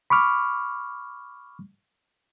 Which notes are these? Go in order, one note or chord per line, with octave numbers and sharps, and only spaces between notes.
B5 C#6 D6 F6